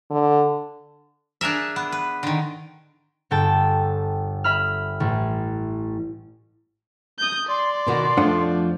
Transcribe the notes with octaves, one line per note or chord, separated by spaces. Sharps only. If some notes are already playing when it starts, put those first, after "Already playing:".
D3
D4 G#4 A#4 E5
B3
B4
D3 D#3
G1 A4 G5 A5
E5 B5 F6
A1
D#6 G6
D5 C6
B2 D#3 F#4
F2 F3 A3 D4 F#5